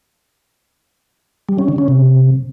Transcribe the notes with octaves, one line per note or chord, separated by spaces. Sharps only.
G3
C#4
D3
C#4
C3